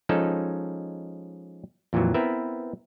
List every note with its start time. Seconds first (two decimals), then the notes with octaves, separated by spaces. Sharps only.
0.09 F3 G#3 C#4 D#4 A4
1.93 F2 A#2 E3 F#3
2.14 B3 C4 E4 A#4 B4 E5